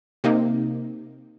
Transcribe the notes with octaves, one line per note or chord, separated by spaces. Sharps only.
C3 A#3 D#4